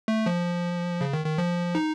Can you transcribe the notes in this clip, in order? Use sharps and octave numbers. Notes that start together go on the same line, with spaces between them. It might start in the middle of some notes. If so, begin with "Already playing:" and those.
A3
F3
C#3
D#3
D#3
F3
D#4